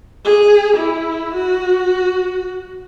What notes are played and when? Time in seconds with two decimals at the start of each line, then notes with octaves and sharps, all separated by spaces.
0.25 G#4
0.76 E4
1.34 F#4